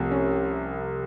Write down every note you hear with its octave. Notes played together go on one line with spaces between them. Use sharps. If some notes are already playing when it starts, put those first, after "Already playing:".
Already playing: C2 C3 F3 A3
C#4